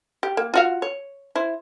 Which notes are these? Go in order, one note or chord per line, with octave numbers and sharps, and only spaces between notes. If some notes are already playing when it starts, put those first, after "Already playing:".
G4
A#3
F4 F#4 F5
C#5
E4 C5